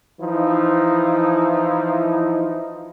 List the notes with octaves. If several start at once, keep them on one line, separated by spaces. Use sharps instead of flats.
E3 F3 D#4 E4